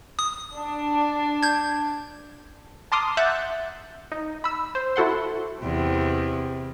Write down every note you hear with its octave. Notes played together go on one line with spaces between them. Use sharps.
D#6
D4
G6 G#6
A5 A#5 C6 D6 D#6 F6
E5 F#5 E6 F#6 G6 A6
D#4
B5 E6
C5
E4 F#4 A4 F#5 C6
E2 C3